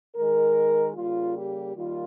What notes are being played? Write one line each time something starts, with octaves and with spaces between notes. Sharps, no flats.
D#3 G#3 A#4
C#3 G3 A#3 F4
G4
D#3 G3 A#3 F4